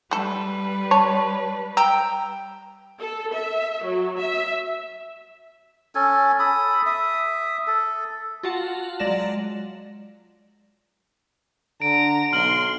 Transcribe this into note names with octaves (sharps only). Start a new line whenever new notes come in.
G3 A3 A4 B4
C#5 A5
G5 A#5 E6
A4
E5
F#3
E5
C#4 A4 G#5
A4 B5 D#6
E5 D#6
A4
F4 F#4 F5 F#5 A5
F#3 G#3 D5 A#6 E7
D3 A#5 D7
B1 C6 F6 F#7